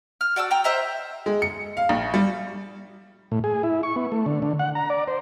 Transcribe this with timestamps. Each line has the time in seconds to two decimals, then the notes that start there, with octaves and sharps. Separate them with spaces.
0.21 F6
0.36 F#4 D5 A5 E6
0.51 G5 A#5
0.64 C5 D#5 E5 A#5
1.26 G#3
1.42 C#7
1.77 F5
1.89 A#1
2.14 G3
3.32 A2
3.44 G#4
3.63 E4
3.83 C#6
3.96 B3
4.12 A3
4.26 D3
4.42 D3
4.59 F#5
4.75 A#5
4.90 D5
5.08 C5